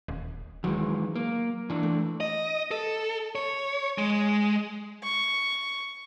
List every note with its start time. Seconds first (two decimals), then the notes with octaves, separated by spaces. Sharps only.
0.08 D#1
0.64 D#3 E3 F#3 G#3
1.16 A#3
1.70 E3 D4
1.83 A3
2.20 D#5
2.71 A4
3.35 C#5
3.98 G#3
5.03 C#6